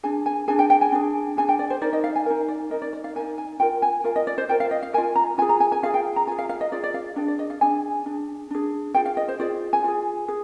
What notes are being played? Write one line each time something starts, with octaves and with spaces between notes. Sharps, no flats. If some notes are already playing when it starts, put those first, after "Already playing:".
D4 G#4 G#5
G#5
D4 G#4 G#5
G5
G5
G#5
D4 G#4
D4 G#4 G#5
G5
D5
C5
D#4 A#4 D5
D#5
F5
G#5
D#4 A#4 G#5
D5
D#4 A#4 D#5
D5
D5
F5
D#4 A#4 G#5
G#5
F4 A#4 G5
G#5
F4 A#4 F5
D#5
D5
C5
F4 A#4 G5
F5
D#5
F5
F4 A#4 G#5
A#5
F4 G#4 G#5
A#5
G#5
G#5
F4 G#4 F5
G5
A#5
F4 G#4 G#5
F5
F5
D#5
F4 G#4 D5
D5
F5
D4 G#4 G5
D5
D#5
F5
D4 G#4 G#5
D4 G#4
D4 G#4
F4 G#4 G5
F5
D#5
C5
F4 G#4 D5
G#5
F4 G#4
G#4